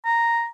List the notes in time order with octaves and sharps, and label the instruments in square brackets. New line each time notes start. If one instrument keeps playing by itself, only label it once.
[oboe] A#5